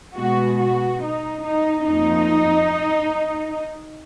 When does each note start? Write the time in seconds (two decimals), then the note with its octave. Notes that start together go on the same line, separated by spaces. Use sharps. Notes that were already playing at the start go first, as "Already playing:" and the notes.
0.16 B2 G#3 B3 F#4
0.59 F#4
1.02 D#4
1.45 D#4
1.88 F2 F3 A#3 D#4